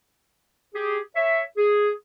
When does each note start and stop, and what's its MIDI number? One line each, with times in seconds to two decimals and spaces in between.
0.73 0.98 67
0.73 0.98 68
1.14 1.41 73
1.14 1.41 76
1.56 1.90 68